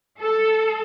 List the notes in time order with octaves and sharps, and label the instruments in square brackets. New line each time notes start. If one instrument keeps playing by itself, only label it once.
[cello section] A4